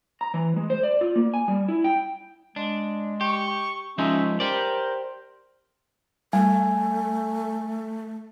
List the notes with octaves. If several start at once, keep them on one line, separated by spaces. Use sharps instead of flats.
A#5
E3
G#3
C5
D5
F4
A#3
G#5
G3
E4
G5
G#3 D4
G4 C#6
F3 G#3 C#4 D#4 E5
G4 A#4 C5 D5
G3 A3 G#5